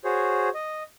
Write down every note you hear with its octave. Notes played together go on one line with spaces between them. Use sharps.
F#4 G#4 C5 C#5
D#5